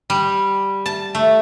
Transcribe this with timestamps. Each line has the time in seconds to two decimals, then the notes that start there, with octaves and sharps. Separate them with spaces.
0.10 G3
0.86 A5
1.15 A3